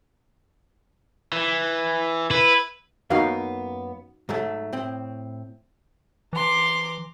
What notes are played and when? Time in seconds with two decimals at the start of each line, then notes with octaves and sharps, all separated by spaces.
1.33 E3
2.31 E4 B4
3.10 F#2 A#3 B3 D#4 F#4 F5
4.29 G#2 F#3 A3
4.73 A2 C4
6.33 E3 A#5 C6 D6